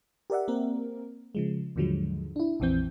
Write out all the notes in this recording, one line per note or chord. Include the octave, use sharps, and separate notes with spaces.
G4 A#4 D5 E5 F#5
A#3 C4 A#4
C#3 F3 G#3
D#2 G#2 D3 F3 F#3 G#3
D4 E4
A#1 F2 E3 C4 G6